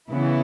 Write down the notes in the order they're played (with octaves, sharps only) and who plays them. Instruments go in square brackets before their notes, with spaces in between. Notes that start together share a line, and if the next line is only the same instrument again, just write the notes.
[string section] C#3 E3 B3 E4